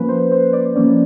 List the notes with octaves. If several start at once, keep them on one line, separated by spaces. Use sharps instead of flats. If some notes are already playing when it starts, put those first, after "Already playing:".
Already playing: F3 A#3 C#4 B4
C5
C5
D5
F3 A#3 C#4 D5